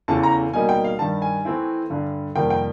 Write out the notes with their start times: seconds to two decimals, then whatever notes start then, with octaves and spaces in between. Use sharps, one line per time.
0.08 E2 C#3 E3 A3 A5
0.23 A#5
0.53 B2 G3 A#3 D#4 G#5
0.69 G5
0.84 F5
0.99 G2 D#3 G3 A5
1.22 G#5
1.45 E3 A3 C4 E4
1.90 G2 D3 G3
2.35 F2 C3 D#3 G3 A#3 G5
2.50 G5